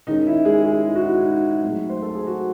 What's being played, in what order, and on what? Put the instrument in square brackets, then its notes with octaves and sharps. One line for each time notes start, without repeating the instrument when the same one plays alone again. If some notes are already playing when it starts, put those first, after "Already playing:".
[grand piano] D#3 G#3 C#4 D#4
E4
G#3 G#4
G#3 G#4
E4
F#4
E4
D#4
A2 F#3 A3 C4
C5
A4
G#4
F#4